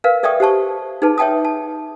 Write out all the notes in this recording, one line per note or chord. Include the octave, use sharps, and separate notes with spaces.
A#4 B4 F5
A4 D5 E5 G5 C#6 D#6
G4 C5 A5 C#6
D#4 G#4 B4 A5
C#5 E5 G5 A5 D#6
A5